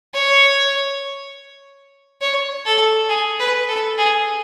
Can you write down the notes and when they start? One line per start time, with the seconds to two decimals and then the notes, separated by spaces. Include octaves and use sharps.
0.14 C#5
2.21 C#5
2.66 A4
3.10 G#4
3.40 B4
3.68 A4
3.98 G#4